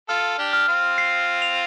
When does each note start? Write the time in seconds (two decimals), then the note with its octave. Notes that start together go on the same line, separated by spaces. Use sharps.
0.09 F4 A4 F6
0.38 D4 G4
0.53 F6
0.68 C4 F4
0.98 C7
1.42 F7